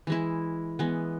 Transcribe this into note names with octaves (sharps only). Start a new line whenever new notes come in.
E3 G#3 E4
E3 G#3 B3